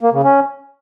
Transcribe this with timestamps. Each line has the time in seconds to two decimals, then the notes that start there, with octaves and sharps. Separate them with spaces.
0.01 A#3
0.12 C#3
0.23 C#4